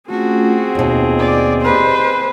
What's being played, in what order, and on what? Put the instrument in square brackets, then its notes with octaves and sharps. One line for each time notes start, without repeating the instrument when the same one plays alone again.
[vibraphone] A3 C#4 F4 [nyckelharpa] C4 G#4 [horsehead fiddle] F#4
[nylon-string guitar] D#2 B2 [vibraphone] B3 F4
[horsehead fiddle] D5
[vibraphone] G4 D#5 [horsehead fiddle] B4 C5